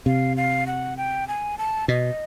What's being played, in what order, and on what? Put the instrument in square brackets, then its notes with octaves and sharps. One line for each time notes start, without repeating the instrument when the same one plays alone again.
[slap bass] C3 [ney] F5
[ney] F5
F#5
G5
G#5
A5
[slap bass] B2 [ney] D#5